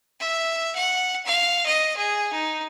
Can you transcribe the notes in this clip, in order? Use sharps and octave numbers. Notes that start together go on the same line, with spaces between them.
E5
F#5
F5
D#5
G#4
D#4